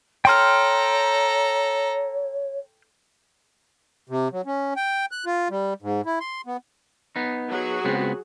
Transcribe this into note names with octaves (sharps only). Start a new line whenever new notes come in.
A4 C#5 G5 A#5 C6 F6
C3
F#3
C#4
G5
F#6
F4
G3
G#2
E4
C6
B3
B3 D#4
F#3 F#4 G#4
C#2 B3 C4